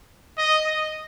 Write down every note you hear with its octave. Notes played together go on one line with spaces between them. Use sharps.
D#5
D#5